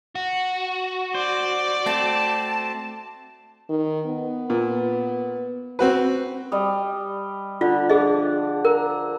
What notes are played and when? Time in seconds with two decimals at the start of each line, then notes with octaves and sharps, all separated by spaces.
0.15 F#4
1.15 C5 D5
1.86 A3 C4 A5
3.69 D#3
4.07 B3
4.50 A#2
5.79 C4 F#4 B4
6.52 G3 D#5
7.61 D3 F4
7.90 F3 D4 G#4 D#5
8.65 A#4 A#5